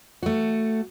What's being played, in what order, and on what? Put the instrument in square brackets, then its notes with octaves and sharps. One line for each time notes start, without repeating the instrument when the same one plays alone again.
[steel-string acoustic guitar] A3 F#4